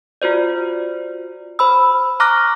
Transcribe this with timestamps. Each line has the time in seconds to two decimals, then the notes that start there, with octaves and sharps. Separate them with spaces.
0.22 F4 F#4 C5 D5
1.59 C5 B5 E6
2.20 A#5 C#6 D6 F6 F#6 A#6